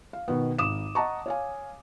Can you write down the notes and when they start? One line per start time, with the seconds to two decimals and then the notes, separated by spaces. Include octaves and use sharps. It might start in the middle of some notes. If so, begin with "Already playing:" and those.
0.13 F5
0.28 B2 D#3 B3
0.59 G#1 D6 D#6 E7
0.95 D#5 F#5 A5 A#5 C#6
1.26 C#5 F5 G#5